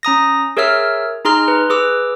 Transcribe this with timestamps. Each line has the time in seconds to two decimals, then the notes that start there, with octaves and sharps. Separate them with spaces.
0.03 C#4 A#5 D#6 A#6
0.57 G#4 A#4 C#5 E5 E6 F6
1.25 D#4 G#4 A#5 C6 F6
1.48 B4
1.70 G#4 B4 D6 E6